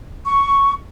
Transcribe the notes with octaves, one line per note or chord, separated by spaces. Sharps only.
C#6